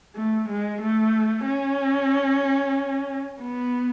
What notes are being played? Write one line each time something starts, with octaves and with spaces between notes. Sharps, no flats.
A3
G#3
A3
C#4
B3